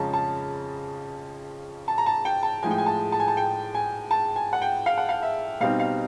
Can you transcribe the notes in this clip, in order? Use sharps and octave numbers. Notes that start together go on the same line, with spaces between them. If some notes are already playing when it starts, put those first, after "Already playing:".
Already playing: F2 C#3 F3 G#3 C#4 A5 A#5
A5
A5
A#5
A5
G5
A5
A2 F3 G#3 G#5
G5
G#5
A5
A5
G#5
A5
G5
G#5
A5
G#5
F#5
G5
F5
F#5
F5
E5
B2 G3 C4 D#4 F5
F5